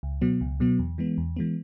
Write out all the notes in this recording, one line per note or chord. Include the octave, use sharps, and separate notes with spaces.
C#2
B2 F#3 B3
C#2
B2 F#3 B3
E2
E3 G#3 B3
E2
E3 G#3 B3